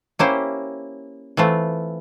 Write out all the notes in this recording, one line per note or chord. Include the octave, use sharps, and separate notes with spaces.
A#3 C#4 E4 G4 C5
E3 A3 C4 F4